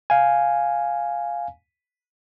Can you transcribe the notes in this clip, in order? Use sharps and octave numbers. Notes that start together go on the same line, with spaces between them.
F5 G#5